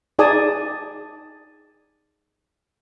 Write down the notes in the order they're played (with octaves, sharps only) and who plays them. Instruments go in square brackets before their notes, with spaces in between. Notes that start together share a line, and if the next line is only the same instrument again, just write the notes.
[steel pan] D#4 G#4 D5 G#5 A5 D#6